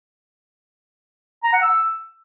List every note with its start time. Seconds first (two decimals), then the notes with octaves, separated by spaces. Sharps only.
1.43 A#5
1.53 F#5
1.62 E6